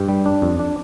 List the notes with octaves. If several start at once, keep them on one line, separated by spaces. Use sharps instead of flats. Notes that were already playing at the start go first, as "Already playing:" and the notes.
Already playing: G2 G4
G3
D4
F2
D4